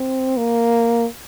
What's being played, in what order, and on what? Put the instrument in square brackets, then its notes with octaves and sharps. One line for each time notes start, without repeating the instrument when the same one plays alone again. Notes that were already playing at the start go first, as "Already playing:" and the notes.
Already playing: [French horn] C4
A#3